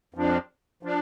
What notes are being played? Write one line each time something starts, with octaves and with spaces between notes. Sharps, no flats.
F2 F3 D4
F3 D4